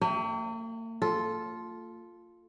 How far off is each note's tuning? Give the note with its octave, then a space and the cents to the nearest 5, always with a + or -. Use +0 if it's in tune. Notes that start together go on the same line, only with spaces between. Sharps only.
A#3 -45 E5 +0 G5 +0
F4 +0 A4 -10